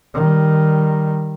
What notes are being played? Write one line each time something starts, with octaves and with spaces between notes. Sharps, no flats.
D#3 G3